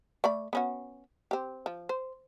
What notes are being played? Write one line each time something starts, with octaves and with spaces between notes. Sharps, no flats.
A3 D5 B5
B3 C#4 F#4
C4 G4
F3
C5